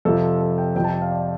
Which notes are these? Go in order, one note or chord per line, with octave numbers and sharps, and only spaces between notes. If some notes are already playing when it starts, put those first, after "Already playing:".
F2 C3 F3 A4
A4
G5
F2 C3 F3 G5
A5
G5
F5
D5